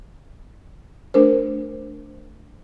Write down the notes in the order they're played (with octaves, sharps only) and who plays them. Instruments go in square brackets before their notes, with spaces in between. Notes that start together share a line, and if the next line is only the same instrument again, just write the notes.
[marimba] A3 D4 A#4 C5